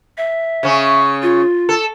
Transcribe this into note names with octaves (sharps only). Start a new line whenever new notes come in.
E5
C#3 C#4
F4
A4